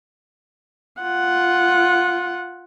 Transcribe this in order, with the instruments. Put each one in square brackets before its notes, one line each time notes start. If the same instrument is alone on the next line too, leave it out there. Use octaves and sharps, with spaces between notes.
[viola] F4 F#5